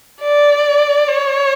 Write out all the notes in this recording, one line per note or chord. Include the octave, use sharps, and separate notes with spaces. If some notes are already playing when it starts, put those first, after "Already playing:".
D5
C#5